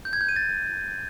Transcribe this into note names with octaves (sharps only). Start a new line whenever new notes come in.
G6
G#6
G6
D#7
A6